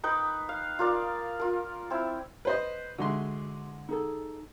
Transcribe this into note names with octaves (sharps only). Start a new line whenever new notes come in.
D#4 B4 G5
F5
F4 A#4 D5
F4 A#4
C4 E4
B4 C5 D#5
D3 G#3 F#4 E5 C6
D#4 G#4 A4